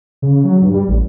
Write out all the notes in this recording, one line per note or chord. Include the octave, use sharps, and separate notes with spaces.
C#3
F#3
G2
G3
A1